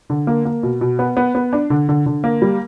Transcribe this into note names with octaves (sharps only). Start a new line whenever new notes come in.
D3
A#3
A#3
B2
B2
B3
B3
B3
D4
D3
D3
D3
A#3
G3